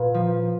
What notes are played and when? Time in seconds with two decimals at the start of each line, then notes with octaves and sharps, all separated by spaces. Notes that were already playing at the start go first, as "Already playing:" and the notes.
Already playing: A#2 B4
0.14 F3